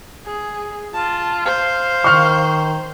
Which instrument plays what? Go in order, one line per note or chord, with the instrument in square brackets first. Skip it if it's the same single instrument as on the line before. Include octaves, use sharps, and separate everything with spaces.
[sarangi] G#4
[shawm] F4 [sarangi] A5
[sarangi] C5 [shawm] F5
[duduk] D#3 [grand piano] C#6 F6